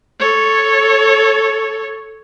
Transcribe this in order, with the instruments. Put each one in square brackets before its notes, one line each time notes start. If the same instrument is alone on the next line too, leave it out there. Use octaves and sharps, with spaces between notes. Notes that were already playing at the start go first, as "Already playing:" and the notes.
[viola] A4 C#5